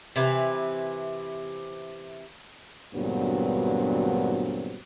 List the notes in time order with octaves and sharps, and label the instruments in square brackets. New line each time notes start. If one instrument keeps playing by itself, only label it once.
[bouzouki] C3 E3 B4
[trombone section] D2 G2 A#2 F#3 B3 C4